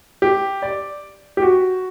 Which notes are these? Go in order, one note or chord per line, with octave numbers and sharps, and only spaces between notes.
G4
D5
G4
F#4